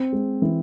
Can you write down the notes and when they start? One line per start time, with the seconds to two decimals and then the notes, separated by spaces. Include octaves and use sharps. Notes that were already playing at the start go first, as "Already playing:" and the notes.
Already playing: C4
0.13 G#3
0.42 E3